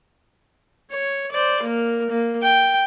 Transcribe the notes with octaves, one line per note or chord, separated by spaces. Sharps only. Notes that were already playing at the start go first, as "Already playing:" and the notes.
C#5
C5 D5
A#3 A#4
A#3
G5